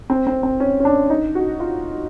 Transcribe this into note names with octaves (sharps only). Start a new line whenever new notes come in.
C4
C4
C4
C#4
C#4
D4
D#4
F#4
F4